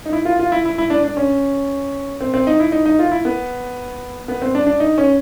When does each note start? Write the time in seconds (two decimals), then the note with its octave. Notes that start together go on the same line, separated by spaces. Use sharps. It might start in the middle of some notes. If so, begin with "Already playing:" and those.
0.06 D#4
0.13 E4
0.25 F4
0.39 F4
0.52 E4
0.65 E4
0.78 E4
0.90 D4
1.04 D4
1.17 C#4
2.21 C4
2.34 C4
2.47 D#4
2.60 E4
2.72 D#4
2.86 D#4
2.99 F4
3.11 E4
3.25 B3
4.28 B3
4.42 C4
4.55 D4
4.67 D4
4.80 D#4
4.98 C#4